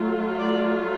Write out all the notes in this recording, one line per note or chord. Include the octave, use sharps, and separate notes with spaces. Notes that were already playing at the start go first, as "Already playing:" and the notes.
Already playing: F#3 A3 F4
D5